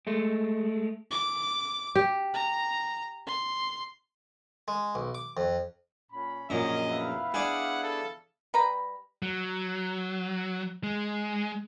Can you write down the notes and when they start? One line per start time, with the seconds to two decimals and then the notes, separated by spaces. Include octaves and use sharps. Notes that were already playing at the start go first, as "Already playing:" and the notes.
0.07 G#3 A3
1.11 D6
1.95 G4
2.34 A#5
3.27 C6
4.68 G#3
4.95 B1
5.15 D6
5.37 F2
6.12 A#2 C#4 B5
6.50 A#1 F#2 C#4 D#5
6.89 B3 E4 F5
7.34 D4 G#4 F#5
7.83 A4
8.54 G3 B4 A#5 B5
9.23 F#3
10.83 G#3